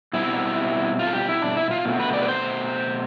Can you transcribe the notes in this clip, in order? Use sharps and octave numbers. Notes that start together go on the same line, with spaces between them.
B2 G3 C4 E4
F4
A4
G4
E4
D4
E4
F4
B2 A3 C4
B4
D5
B4
C5